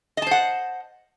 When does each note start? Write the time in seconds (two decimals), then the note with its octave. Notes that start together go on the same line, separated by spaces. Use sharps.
0.17 D#5
0.22 A5
0.27 C5
0.31 F#5